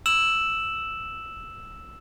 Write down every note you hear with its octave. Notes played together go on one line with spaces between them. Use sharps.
E6 E7 F#7